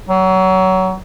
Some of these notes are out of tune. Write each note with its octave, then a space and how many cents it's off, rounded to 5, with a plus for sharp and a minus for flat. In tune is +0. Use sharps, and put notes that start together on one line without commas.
F#3 +25